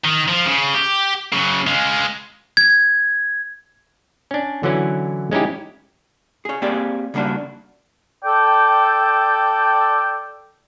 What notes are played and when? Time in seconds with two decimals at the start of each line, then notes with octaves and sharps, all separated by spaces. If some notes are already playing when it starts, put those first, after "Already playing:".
0.04 D#3
0.28 F3
0.46 C#3
0.74 G4
1.33 C#3 F#3
1.67 G#3 F4
2.57 G#6
4.31 C#4 D4
4.63 D3 E3 F#3 C#4 E4
5.31 G#3 C#4 D#4 E4 G4
6.45 G#4 C#5
6.62 A#3 C4 G4 G#4 C5 D5
7.14 C#3 G3 A#3 D4 F#4
8.24 A4 D5 G5